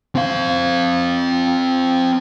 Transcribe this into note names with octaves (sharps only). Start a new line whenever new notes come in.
C4 F5